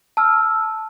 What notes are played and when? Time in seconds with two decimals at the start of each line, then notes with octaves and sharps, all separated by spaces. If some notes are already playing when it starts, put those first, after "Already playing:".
0.17 A5 E6 F6